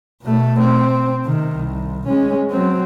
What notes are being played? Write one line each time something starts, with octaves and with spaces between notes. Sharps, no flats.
B2 A3
C4
C3 D#3
C2
G#3 C#4
F#3 C4